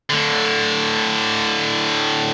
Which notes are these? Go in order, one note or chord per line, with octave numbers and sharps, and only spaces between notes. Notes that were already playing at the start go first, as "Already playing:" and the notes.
A2 D3